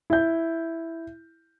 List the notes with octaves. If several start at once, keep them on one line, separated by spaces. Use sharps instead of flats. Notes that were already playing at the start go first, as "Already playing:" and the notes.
E4 G6